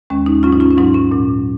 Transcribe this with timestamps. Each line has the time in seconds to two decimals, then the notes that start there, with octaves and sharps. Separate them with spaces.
0.10 D#2 D#3 G#3 C#4
0.26 D#4
0.43 F#3 C#4 F4
0.47 G#2
0.52 D#4
0.60 C#4 F4
0.71 C#4
0.77 G#2 F#3 D#4
0.94 C#4
1.11 A#2 F#3